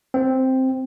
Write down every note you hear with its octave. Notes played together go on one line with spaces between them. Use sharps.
C4